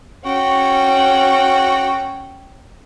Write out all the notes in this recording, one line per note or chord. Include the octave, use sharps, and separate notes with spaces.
C#4 F#4 G5